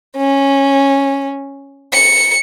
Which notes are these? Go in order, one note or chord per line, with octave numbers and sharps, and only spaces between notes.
C#4
C#7